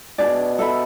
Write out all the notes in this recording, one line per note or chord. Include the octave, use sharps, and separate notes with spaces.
B2 D4 G#4 D5
A4 E5 B5